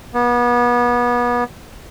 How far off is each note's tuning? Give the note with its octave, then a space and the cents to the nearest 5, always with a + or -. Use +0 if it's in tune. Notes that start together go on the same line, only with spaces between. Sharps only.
B3 -30